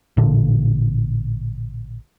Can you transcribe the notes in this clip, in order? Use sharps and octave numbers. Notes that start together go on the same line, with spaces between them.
A1 A#2 D3